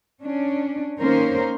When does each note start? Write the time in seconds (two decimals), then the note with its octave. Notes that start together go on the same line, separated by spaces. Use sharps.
0.22 C#4 D4
0.99 D#3 A#3 C#4 A#4 C5